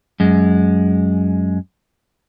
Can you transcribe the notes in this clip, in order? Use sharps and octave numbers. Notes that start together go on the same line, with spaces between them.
F#2 G#3